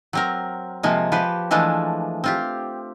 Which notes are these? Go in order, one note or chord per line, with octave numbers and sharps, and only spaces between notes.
F#3 C4 A#4
C3 F3 G#3 A#3
F3 G4 B4
E3 F3 G#3 A3 D4
C4 F4 G4